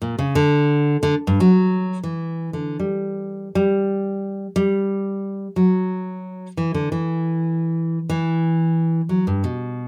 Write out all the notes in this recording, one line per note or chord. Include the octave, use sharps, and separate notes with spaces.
A#2
C#3
D3
D3
G2
F#3
E3
D3
G3
G3
G3
F#3
E3
D3
E3
E3
F#3
G2
B2